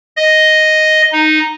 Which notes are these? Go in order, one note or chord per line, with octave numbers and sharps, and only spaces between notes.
D#5
D#4